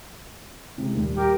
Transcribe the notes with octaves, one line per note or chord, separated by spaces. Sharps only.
C3 G#3
D#2 A#2 G3
G4 A#4